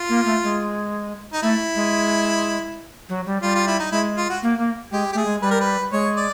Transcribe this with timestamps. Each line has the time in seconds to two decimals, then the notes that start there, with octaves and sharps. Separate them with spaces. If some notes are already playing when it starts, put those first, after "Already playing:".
Already playing: F4
0.09 A#3
0.25 A3
0.43 G#3
1.33 D#4
1.42 A3 E4
1.76 G#3
3.09 F#3
3.26 G3
3.42 G3 F4
3.55 F4
3.67 E4
3.80 D#4
3.92 G#3 E4
4.17 F4
4.30 F#4
4.43 A#3
4.58 A#3
4.92 G#3 G4
5.13 A3 G4 G#4
5.25 G#3
5.41 G3 B4
5.51 A#4
5.60 B4
5.92 G#3 C#5
6.16 D5